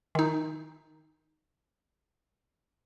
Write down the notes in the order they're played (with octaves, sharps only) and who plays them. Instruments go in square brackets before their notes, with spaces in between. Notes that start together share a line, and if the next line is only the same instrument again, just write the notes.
[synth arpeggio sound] D#3 D#4